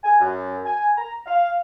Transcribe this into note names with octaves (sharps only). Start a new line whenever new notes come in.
G#5
F#2
G#5
A#5
F5